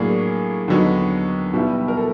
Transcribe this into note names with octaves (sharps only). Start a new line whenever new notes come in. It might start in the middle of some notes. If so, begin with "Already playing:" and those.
Already playing: A2 F#3 A#3 D4 G#4
D#2 D3 F#3 B3 D#4
B2 G3 B3 E4 G4
A#4
A4